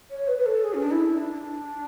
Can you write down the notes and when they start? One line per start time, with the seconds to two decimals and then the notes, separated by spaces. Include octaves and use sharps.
0.11 C#5
0.28 B4
0.38 B4
0.46 A4
0.64 G#4
0.74 C#4
0.82 D4
0.91 E4
1.17 D4